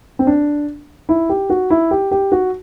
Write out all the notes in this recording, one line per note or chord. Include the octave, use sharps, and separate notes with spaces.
C4
D4
E4
G4
F#4
E4
G4
G4
F#4